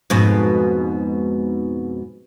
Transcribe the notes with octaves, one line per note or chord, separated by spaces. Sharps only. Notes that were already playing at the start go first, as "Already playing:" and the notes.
F2 G#2 B2